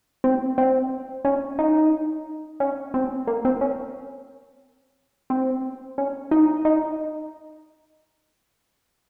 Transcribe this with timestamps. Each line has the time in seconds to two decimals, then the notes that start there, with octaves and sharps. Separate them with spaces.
0.24 C4
0.58 C4
1.25 C#4
1.59 D#4
2.60 C#4
2.94 C4
3.27 A#3
3.45 C4
3.61 C#4
5.30 C4
5.98 C#4
6.31 D#4
6.65 D#4